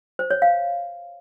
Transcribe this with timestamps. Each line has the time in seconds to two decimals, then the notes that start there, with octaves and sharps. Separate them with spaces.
0.19 C5
0.31 C#5
0.42 F5